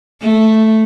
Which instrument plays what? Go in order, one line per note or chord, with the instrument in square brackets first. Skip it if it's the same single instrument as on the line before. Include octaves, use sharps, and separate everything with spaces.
[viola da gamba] A3